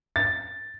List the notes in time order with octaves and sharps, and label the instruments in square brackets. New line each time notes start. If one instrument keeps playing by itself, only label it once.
[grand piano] A6